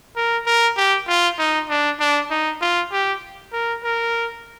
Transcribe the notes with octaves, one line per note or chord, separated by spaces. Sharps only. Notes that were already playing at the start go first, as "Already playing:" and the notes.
A#4
A#4
G4
F4
D#4
D4
D4
D#4
F4
G4
A#4
A#4